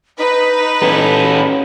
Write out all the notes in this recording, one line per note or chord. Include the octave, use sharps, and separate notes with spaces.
D#4 B4
C#4 A4